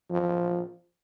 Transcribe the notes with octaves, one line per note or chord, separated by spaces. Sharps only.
F3